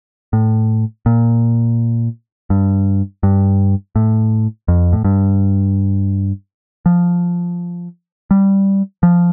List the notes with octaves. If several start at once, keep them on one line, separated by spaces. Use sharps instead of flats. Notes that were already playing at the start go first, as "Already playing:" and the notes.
A2
A#2
G2
G2
A2
F2
A2
G2
F3
G3
F3